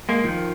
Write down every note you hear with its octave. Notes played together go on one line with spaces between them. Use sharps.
G#3 A#3
D#3 F3